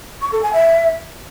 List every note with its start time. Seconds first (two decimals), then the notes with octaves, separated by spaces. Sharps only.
0.22 C#6
0.32 A4
0.43 G#5
0.53 E5